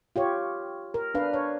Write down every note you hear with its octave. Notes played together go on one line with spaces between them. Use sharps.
F4 G4 C#5
A#4
D4 B4 F5
C#5